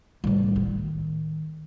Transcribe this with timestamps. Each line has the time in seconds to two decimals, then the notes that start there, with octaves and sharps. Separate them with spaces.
0.24 A2 G3
0.56 D#3